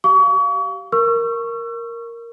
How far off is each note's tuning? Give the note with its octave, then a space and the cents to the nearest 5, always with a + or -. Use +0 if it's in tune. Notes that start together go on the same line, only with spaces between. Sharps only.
G4 -25 F5 +0 C#6 +35
A#4 +0 C#6 +0 E6 +40